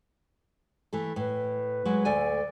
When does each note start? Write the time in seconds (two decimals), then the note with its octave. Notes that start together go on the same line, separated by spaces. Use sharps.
0.93 E3 A3 A4
1.16 A2 B4
1.85 F#3 G#3
2.05 D2 A4 D5 G#5